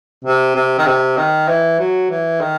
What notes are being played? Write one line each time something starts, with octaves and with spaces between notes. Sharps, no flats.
C3
C3
D#3
C3
D#3
E3
F#3
E3
D#3